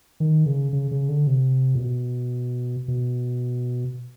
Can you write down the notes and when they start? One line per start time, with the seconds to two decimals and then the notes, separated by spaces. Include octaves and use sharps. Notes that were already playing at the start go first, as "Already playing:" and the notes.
0.20 D#3
0.46 C#3
0.73 C#3
0.91 C#3
1.09 D3
1.27 C3
1.75 A#2
1.80 B2
2.88 B2